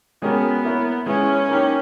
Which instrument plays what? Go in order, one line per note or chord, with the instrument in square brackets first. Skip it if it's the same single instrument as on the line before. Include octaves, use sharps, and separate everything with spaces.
[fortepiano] B2 G#3 C#4 G4 A#4 [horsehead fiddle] B3
[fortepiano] A#3 E4 A#4 C#5
[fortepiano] G#3 B3 E4 [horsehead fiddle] C#4
[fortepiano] A#3 D#4 G4